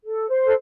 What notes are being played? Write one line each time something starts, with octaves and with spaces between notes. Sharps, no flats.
A4
C5
A4